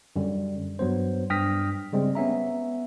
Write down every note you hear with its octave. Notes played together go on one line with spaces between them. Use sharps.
F#2 D3 G3
G2 F#3 B3 C5
G2 G5 D#6 F6 A#6 B6
C#3 G3 G#3 C4
B3 C#4 E5 A#5